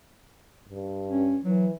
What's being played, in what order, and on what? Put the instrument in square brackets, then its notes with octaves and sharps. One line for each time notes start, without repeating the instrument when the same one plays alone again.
[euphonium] G2
[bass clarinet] C#4
[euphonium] E3 [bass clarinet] F#3